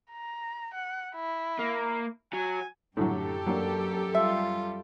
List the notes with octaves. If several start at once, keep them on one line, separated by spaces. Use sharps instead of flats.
A#5
F#5
E4
A#3
F#3 G#5
F#2 A2 D3 F#3 G4 A4
F#3 A#3 D4
G3 F4 E5